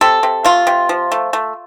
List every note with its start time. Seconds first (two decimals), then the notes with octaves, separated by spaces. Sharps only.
0.01 C3 A4
0.23 C3
0.44 A3 F4
0.67 C3
0.89 F3
1.12 A3
1.33 A3